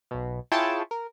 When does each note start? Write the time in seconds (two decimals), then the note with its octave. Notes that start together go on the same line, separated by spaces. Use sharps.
0.11 B1 B2
0.52 E4 F4 G#4 C#5 G5 A5
0.91 A#4